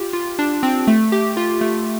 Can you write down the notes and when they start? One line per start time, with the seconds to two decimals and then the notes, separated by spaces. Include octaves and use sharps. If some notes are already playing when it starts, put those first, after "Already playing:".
Already playing: F4 G4
0.13 F4
0.39 D4
0.63 C4
0.87 A3
1.12 G4
1.37 F4
1.61 A3